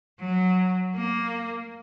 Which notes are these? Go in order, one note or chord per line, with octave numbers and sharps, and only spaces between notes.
F#3
A#3